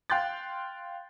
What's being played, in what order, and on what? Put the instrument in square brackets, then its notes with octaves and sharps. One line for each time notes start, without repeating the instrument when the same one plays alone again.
[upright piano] F5 G5 C6 F#6 G6 A6